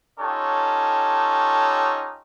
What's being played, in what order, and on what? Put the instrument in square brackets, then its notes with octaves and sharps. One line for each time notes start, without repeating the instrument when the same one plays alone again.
[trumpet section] C#4 D#4 F4 G4 A4 C#5